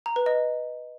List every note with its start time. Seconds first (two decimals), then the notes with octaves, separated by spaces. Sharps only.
0.06 A#5
0.16 B4
0.26 D#5